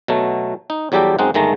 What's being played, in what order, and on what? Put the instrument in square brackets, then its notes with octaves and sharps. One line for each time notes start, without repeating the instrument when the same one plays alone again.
[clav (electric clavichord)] B2 F#3 A3
D#4
E2 F#3 G3 G4 A4 G5
F#2 G#3 C4 D#4 F#5
G1 D#3 G#3 A3 A#5